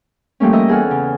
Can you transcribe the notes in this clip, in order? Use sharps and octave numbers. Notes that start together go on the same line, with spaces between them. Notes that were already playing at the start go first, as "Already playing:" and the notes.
F3 G3 A3 A#3 C#4
A#4 D#5 E5 A#5
E2 G#4 A4 F#5 F6
C#3